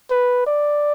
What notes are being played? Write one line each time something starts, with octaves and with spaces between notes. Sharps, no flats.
B4
D5